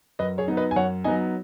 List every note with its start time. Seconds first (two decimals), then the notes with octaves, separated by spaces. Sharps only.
0.19 F#2 B4 D#5
0.38 G#4 C#5
0.48 F#3 B3 D#4
0.57 B4 D#5
0.71 G#5
0.76 F#2 C#5 F#5
1.04 F#3 B3 D#4 D#5 G#5